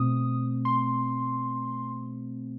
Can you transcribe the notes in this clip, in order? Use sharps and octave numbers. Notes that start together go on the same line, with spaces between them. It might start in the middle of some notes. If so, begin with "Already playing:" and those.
Already playing: B2 A3 C4 D#6
C6